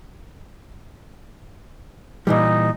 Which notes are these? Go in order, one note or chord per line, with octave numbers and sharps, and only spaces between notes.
A#2 E3 G3 D#4